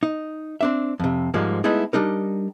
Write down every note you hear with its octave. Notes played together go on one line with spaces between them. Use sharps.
D#4
C4 D4 E5
F2 C3
G#2 F3 G3 G#3 A#3
G#3 A3 B3 D#4 E4 G#4
G3 D4 D#4 A#4